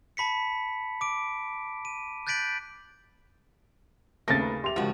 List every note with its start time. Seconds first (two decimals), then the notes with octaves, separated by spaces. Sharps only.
0.17 A5 B5 B6 C#7
1.01 D6 D7
1.85 D#7
2.27 F#6 G6 A6 B6 D7 F#7
4.28 D#2 C#3 A3 C4 A#4 A6 A#6
4.41 B4
4.64 G4 E5 C6 F7
4.76 G#1 C#2 F3 F#4